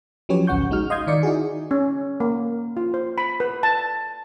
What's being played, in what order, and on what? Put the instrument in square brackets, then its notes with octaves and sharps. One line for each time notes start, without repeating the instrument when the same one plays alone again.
[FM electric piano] F3 F#3 C#4 G4 B4 C#5
A1 D2 C#4 F#5 C#6 G6
G#3 D#4 F#4 F6
D#5 F5 C6 D#6 G6 G#6
D#3 D#4 D5 C#7
D#4 E4 F#4 G#4
[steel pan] C#4
A#3
F4
C5
B5
B4
A5